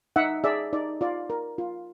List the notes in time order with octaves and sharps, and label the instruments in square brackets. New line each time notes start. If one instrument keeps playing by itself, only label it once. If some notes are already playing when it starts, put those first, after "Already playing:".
[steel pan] D#4 E5 F#5
G#4 D5 E5
D#4 D5
F4 D5
A#4
F4